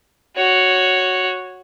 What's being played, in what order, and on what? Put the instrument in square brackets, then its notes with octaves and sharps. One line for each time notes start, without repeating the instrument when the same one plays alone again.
[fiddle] F#4 C#5